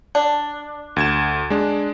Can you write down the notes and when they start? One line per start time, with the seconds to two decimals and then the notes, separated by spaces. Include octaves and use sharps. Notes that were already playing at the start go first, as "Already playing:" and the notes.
0.15 D4
0.96 D2 G#6 E7
1.50 G#3 D4